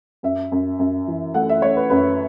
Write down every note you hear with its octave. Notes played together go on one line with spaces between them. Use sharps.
F#2 E5
F#2
F#2
E3
A3 F#5
E5
A3 C#5
B4
F#2 B4